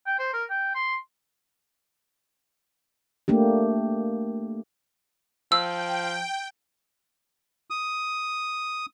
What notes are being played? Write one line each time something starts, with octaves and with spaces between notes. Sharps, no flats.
G5
C5
A#4
G5
C6
A3 A#3 D4 G4
F3 G5 E6
D#6